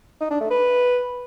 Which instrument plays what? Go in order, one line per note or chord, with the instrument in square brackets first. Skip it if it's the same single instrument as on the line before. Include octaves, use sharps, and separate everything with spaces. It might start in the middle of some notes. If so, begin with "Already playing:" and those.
[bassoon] D#4
D4
A3
B4